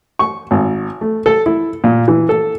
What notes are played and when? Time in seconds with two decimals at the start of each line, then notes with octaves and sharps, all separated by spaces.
0.19 C#6
0.51 G#1
1.01 A3
1.26 A4
1.46 E4
1.84 A#2
2.08 E3
2.29 A4